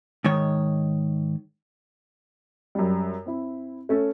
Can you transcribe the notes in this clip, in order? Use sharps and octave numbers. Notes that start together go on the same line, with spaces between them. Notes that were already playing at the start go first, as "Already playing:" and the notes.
G#2 D#3 C#5
F#2 G3
C4 E4
A3 C#4 A4